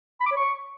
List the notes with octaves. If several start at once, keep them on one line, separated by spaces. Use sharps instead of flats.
B5
D6
C#5
C#6